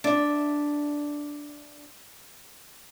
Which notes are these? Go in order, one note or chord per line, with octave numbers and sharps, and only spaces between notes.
D4 E5